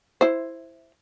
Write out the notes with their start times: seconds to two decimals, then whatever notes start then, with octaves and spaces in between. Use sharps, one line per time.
0.21 E4 C5